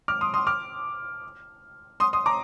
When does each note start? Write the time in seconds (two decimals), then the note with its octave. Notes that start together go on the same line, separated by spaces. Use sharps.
0.08 D6 F6
0.21 C6 D#6
0.34 C6 D#6
0.47 D6 F6
2.00 C6 D#6
2.13 C6 D#6
2.26 A#5 D6